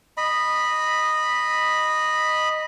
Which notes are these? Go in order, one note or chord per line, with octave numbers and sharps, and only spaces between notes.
D#5 B5